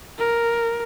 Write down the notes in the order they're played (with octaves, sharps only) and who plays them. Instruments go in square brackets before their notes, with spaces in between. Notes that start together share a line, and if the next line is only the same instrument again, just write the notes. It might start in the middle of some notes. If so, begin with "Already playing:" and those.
[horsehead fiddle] A#4